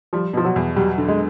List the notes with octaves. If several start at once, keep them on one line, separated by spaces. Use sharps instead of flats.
F3 G3
B2 F3
F#3
E2
F#3 G3
D3
G#3